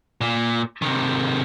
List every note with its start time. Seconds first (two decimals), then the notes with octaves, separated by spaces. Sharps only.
0.21 A#2
0.82 C3 D#3